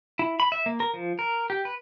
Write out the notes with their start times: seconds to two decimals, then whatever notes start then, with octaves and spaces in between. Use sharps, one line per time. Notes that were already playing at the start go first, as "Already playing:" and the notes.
0.19 E4
0.40 B5
0.52 E5
0.66 A#3
0.80 A#4
0.94 F3
1.19 A#4
1.50 G4
1.65 B4